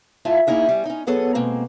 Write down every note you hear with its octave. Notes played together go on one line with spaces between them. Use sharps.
G#2 E4 F4 E5 F5 A5
A#3 C#4 D#4 E4 G#4
G3 C#4
C#4 D#4
F#3 B3 G#4 A4 C#5
B2 G#3 A#3 C4